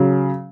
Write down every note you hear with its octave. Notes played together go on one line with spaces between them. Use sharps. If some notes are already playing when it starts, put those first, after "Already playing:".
Already playing: C#3 F#3